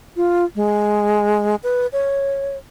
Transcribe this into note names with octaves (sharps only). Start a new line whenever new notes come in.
F4
G#3
B4
C#5